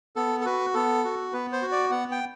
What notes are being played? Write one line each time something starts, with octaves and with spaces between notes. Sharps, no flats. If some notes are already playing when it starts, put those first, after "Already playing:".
B3 A4
A4
F#4 B4
B3 A4
F#4
B3 B4
C5
F#4
D5
B3 F#5
G5